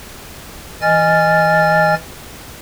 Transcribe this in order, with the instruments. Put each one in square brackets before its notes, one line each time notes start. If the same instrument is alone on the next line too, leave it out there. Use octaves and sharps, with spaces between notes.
[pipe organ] E3 D#5 G#5 F6 A6